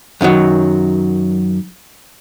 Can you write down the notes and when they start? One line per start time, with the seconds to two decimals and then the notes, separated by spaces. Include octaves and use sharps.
0.21 F#2 D#3 F3 F#3